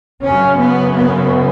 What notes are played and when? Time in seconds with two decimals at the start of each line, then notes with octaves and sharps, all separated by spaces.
0.22 F#2 C#3 C#4
0.57 B3
0.93 B3